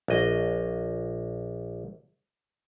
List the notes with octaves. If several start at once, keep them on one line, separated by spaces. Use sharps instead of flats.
A#1 D#5